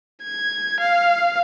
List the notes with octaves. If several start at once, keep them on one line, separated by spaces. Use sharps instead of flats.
G#6
F5